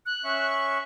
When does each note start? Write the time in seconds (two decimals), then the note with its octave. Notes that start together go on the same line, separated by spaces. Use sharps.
0.06 F#6
0.24 C#4 E5 C#6